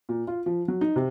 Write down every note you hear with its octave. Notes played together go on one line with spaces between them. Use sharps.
A#2
F4
F3
F#3
D#4
C3